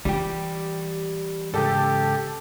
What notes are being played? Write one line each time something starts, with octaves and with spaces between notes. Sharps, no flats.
E3 G3 G4
G#2 C#3 G4 A4